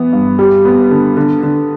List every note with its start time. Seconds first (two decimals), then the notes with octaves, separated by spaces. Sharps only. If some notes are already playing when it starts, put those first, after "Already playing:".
Already playing: E3 B3
0.13 G2
0.39 G3
0.65 B3
0.91 D3
1.17 D3
1.43 D3